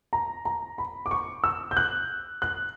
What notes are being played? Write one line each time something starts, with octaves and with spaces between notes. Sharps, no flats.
A#5
A#5
B5
D6
C#6
E6
G6
F#6
F#6